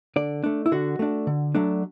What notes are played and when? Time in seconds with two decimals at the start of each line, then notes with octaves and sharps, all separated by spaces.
0.16 D3 D5
0.44 A3 D4
0.66 E4
0.72 D3 F#4
0.99 A3 D4
1.27 D3
1.55 F#3 A3 D4